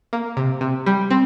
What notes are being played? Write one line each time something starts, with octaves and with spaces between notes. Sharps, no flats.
A#3
C3
C3
G3
C4